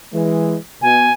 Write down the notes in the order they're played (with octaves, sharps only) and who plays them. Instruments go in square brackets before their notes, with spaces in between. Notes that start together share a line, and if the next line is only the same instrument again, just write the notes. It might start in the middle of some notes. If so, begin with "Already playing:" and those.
[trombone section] E3 G#3
[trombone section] B2 [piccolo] G#5